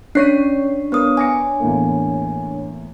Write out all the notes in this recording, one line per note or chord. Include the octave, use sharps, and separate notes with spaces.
C#4 D4 C#5 F#6 B6 C7 D#7
B3 A#4 B4 D#6
G#5 D6 A#6 C#7
E2 A2 A#3